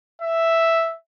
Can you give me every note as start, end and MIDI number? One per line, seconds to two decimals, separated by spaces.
0.21 0.94 76